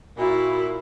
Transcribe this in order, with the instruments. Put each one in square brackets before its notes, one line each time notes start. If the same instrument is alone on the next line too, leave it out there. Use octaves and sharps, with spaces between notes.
[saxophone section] A#2 [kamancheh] E4 [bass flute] F#4